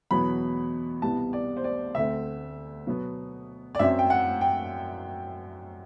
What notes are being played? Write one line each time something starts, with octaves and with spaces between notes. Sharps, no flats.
E2 B2 F#3 B3 B5
C2 B2 G3 B3 A5
D5
C5
D5
D2 D3 A3 C4 E5
B2 F#3 B3
D5
F#2 F#3 C4 E5
G5
F#5
G5